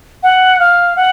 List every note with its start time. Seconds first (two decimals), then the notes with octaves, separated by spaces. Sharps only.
0.23 F#5
0.59 F5
0.96 F#5